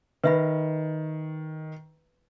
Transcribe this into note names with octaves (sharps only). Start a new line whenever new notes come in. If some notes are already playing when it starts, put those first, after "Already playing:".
D#3 B4 E5 B5